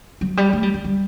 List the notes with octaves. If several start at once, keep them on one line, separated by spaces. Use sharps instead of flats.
F#3
G3
A3
G3
F#3
G3